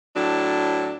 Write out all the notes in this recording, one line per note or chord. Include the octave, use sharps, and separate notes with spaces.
A2 F#3 D4